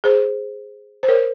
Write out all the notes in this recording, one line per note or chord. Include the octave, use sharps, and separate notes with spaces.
G#4 C5
C5
A#4 C#5